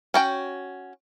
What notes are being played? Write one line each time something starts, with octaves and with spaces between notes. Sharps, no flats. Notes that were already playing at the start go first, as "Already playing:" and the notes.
C#4 F#4 G5